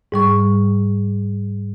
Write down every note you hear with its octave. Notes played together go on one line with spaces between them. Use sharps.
G#2 G3 C#6